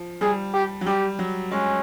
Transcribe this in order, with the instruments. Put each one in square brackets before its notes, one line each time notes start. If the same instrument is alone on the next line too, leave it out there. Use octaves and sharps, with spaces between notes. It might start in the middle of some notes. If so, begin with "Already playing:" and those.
Already playing: [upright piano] F3
[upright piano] G3 [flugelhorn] G#4
[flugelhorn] G4
[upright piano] F#3
[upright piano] G3 [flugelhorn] G4
[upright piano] F#3
[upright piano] G#3 [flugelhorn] C#4